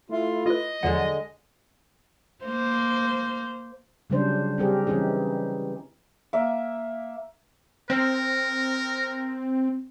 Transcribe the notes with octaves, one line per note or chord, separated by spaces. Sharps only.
A3 E4 F4
F4 B4 D#5
E2 D3 F3 F#3 G#3 F#5
A#3 C5
C#3 F#3 G3 C#4 D4 C5
G3 C4 G4 G#4 A#4
E3 G3 C4 C#4 D#4 G#4
A#3 E5
C4 A#4